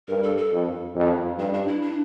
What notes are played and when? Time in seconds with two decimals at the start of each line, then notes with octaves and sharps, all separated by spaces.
0.08 G2 A#4
0.23 A4
0.37 A4
0.52 F2
0.95 F2
1.38 G2 D4
1.54 D4
1.67 E4
1.82 D4